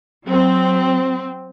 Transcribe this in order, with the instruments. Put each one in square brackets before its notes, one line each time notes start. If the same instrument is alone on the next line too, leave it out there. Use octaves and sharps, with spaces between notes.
[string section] F#3 C4